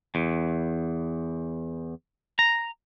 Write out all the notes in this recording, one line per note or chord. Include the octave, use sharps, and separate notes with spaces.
E2
A#5